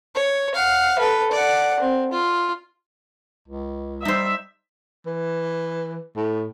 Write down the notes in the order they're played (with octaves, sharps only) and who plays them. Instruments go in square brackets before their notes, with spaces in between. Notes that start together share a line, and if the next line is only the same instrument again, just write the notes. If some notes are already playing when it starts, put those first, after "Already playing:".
[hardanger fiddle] C#5
F5 F#5
A4 B4
D5 F#5
C4
F4
[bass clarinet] C#2
[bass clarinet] G3 [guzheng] D#4 C5 [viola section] E5
[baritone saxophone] E3
A2